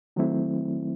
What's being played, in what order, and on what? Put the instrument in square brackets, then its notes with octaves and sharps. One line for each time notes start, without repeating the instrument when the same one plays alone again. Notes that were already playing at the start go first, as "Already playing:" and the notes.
[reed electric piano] D#3 F#3 A3 C4 E4